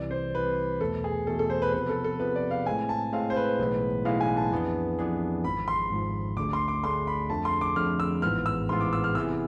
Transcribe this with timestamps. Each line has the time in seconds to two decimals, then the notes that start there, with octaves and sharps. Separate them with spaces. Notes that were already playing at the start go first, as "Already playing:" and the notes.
Already playing: C2 C3 E3 D5
0.11 C5
0.35 C2 C3 E3 B4
0.81 E2 B2 A3 A4
1.04 G#4
1.27 E2 B2 A3 A4
1.39 A4
1.50 C5
1.62 B4
1.73 C3 F3 B3 B4
1.89 A4
2.04 A4
2.19 C3 F3 B3 B4
2.36 D5
2.51 F5
2.66 A2 G#3 C4 G#5
2.89 A5
3.12 A2 G#3 C4 F5
3.30 C5
3.36 B4
3.59 B1 A2 E3 G#3 B3
4.05 B1 A2 E3 G#3 B3 F5
4.21 G#5
4.37 A5
4.51 F2 E3 B3 D4 G#4
4.99 F2 E3 B3 D4 G#4
5.44 G#1 G#2 F3 B5
5.68 C6
5.91 G#1 G#2 F3
6.37 D2 D3 A3 D4 G#4 D6
6.53 C6
6.68 D6
6.84 D2 D3 A3 D4 G#4 C6
7.07 B5
7.30 F2 D3 F3 A3 A5
7.45 C6
7.61 D6
7.76 F2 D3 F3 A3 F6
8.00 E6
8.22 A1 G#2 E3 B3 F4 F6
8.46 E6
8.69 A1 G#2 E3 B3 F4 C6
8.80 D6
8.93 E6
9.04 F6
9.15 C3 E3 B3 E4 G#4 E6